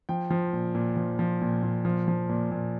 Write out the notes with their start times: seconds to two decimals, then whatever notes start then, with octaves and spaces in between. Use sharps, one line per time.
0.09 F3 G5
0.30 F3
0.53 A#2
0.75 A#2
0.97 F3
1.19 F3
1.41 A#2
1.63 A#2
1.85 F3
2.08 F3
2.29 A#2
2.51 A#2